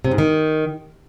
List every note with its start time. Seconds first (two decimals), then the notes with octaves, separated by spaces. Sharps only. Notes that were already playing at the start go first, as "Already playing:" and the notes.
0.04 C3
0.11 G#2
0.18 D#3